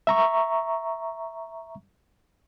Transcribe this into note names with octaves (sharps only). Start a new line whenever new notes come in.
E5 A#5 C#6